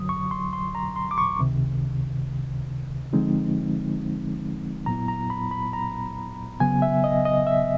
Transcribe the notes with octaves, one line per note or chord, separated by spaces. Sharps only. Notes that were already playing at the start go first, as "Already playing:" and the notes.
Already playing: F#2 D3 F#3 D#6
C#6
C6
C6
A#5
C6
D6
C#6
C#2 C3 D#3
D3 F3 G#3 C4 D#4
A#2 F#3 B3 E4 A#5
A#5
B5
B5
A#5
C#3 F#3 B3 G#5
E5
D#5
D#5
E5